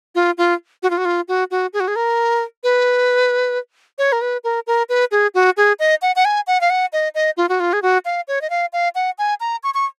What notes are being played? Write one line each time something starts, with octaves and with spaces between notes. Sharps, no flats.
F4
F4
F#4
F4
F#4
F4
F#4
F#4
G#4
F#4
G#4
A#4
B4
C#5
A#4
B4
A#4
A#4
B4
G#4
F#4
G#4
D#5
F#5
F#5
G#5
F#5
F5
F#5
D#5
D#5
F4
F#4
F4
G#4
F#4
F5
C#5
D#5
F5
F5
F#5
G#5
A#5
C#6
C#6